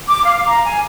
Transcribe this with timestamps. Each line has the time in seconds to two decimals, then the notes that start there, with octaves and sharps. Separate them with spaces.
0.08 D6
0.24 F5
0.46 A#5
0.64 G#5